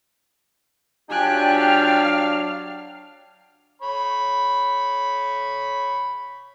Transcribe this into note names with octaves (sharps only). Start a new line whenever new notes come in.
F#3 D4 F4 G4 G5 G#5 F#6
F5 F6
C#5 B5